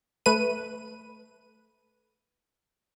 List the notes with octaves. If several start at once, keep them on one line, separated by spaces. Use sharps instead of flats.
A3 B4 D#7